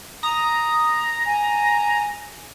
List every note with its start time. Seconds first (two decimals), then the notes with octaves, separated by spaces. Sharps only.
0.23 A#5 D#6
1.26 G#5